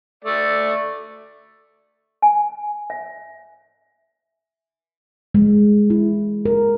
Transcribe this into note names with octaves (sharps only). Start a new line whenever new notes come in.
A3 D5
G#5
E5
G#3
E4
A#4